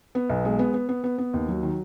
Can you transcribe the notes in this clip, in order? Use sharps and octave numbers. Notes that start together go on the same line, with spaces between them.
B3
B1
G#3
B3
B3
B3
B3
B3
D#2
F#3
D#3